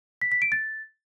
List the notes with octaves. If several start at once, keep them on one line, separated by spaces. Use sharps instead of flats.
B6
B6
D7
A6